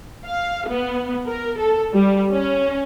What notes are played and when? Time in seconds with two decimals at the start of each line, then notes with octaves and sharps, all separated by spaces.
0.24 F5
0.67 B3
1.27 A#4
1.58 A4
1.93 G3
2.30 C#4